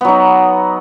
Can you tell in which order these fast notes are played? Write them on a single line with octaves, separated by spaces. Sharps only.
B3 F#3 D#4